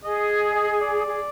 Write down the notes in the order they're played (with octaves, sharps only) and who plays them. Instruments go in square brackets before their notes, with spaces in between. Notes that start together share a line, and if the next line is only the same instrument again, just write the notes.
[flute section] G#4 [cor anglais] D#5
[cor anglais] D#5
D5
[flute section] G#4